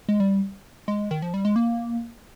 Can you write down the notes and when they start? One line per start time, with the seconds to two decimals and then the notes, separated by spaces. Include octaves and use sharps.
0.08 G#3
0.20 G3
0.88 G#3
1.11 D#3
1.22 F3
1.34 G3
1.45 G#3
1.56 A#3